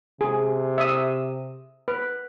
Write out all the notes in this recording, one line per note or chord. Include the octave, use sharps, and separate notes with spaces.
C3 G#4
E5 D#6
B4